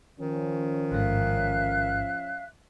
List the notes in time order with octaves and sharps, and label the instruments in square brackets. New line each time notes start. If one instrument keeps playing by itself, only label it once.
[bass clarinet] D#3 [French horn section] F3 C#4
[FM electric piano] A1 G#2 [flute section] E5 F5 F#6